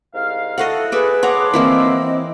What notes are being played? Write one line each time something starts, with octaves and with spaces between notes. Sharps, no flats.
C2 G#2 F5
A2 E4 F#4 A4 D#5 F5 F#5
G#4 A4 B4 D5 E5
C#5 F#5 A5 A#5 C6 D6
E3 A#3 C4 E4 D#5